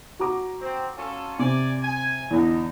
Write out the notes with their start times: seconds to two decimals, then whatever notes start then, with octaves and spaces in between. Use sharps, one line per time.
0.19 F#4 A#5 D6
0.60 C4
0.96 C#4 F4 A4
1.39 C3 D5 G#5
1.82 G#5
2.31 E2 D3 D#4